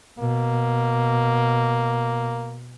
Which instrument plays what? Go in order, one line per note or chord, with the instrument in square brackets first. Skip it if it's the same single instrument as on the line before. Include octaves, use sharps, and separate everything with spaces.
[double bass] B2 [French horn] A#3